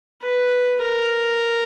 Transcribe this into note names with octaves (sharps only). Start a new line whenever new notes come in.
B4
A#4